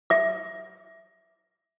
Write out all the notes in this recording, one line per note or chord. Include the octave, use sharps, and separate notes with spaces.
E5 D6